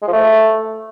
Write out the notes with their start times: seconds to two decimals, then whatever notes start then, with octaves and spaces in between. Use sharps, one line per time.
0.02 G#3
0.08 F3
0.13 A3